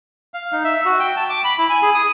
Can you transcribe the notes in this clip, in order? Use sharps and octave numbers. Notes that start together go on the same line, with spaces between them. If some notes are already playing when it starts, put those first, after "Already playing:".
F5
D#4
E5
F#4
G5
A5
D6
B5
E4
G#5
G#4
D#6